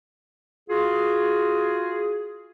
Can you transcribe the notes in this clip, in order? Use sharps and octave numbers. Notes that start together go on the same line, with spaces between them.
F4 F#4 G#4